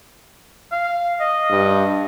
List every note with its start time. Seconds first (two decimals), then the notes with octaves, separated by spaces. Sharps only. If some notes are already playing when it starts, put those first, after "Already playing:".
0.72 F5
1.20 D#5
1.50 G2